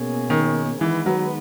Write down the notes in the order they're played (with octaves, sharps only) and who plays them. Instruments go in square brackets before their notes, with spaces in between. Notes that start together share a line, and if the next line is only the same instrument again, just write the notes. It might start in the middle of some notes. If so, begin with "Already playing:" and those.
Already playing: [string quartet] B2 A#3 C#4 G#4
[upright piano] D#3
[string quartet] D#3 G#3 B3 [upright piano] E3
[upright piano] F#3